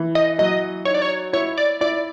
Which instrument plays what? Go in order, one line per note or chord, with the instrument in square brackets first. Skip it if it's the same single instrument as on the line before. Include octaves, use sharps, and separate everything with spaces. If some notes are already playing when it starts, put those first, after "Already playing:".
Already playing: [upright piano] E3
[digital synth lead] D#5
[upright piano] F#3 [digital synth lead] D#5
[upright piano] D#4 [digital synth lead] C#5
[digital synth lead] D5
C#5
[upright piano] E4 [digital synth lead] C#5
[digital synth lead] D5
[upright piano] E4 [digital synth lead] D5